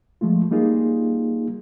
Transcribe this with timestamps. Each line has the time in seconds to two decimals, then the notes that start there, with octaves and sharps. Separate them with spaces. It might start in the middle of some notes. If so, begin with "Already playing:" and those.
0.21 F3 G#3 A3 F4
0.51 G3 A#3 D#4 F4 G#4